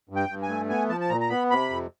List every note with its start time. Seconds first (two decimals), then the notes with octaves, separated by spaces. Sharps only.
0.09 G2
0.16 G5
0.29 G2
0.43 G#5
0.49 A3
0.69 B3 G#5
0.89 F3 A5
1.01 A5
1.09 A#2 A#5
1.21 A#5
1.29 B3 B5
1.50 C3 B5
1.70 F2